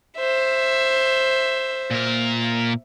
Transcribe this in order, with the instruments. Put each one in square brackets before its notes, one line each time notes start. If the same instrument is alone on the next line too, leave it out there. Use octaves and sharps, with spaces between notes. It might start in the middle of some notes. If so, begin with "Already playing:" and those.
[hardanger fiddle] C5 E5
[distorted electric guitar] A#2 A#4